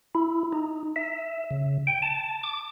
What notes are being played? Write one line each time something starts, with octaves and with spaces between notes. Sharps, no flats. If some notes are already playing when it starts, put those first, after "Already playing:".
E4
D#4
E5
C#3
G5
A5
D6